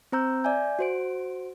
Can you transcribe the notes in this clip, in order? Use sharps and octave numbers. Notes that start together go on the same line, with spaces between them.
C4 C5 A#5 E6 G6
D5 E5 G#5 G6
F#4 C5 D7